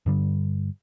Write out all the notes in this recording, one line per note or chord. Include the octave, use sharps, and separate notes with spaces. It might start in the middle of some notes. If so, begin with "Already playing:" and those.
G2 D3 G3